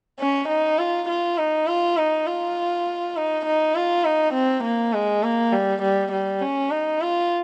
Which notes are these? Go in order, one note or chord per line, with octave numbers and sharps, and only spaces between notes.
C#4
D#4
F4
F4
D#4
F4
D#4
F4
D#4
D#4
F4
D#4
C4
A#3
G#3
A#3
G3
G3
G3
C#4
D#4
F4